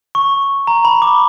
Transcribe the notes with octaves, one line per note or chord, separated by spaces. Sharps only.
C#6
A#5
B5
D6